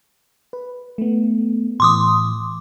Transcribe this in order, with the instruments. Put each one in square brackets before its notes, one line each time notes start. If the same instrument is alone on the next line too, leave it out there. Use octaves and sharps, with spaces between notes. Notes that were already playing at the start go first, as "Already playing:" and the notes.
[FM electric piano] B4
A3 B3
[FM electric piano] A2 E3 [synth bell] C6 D6 D#6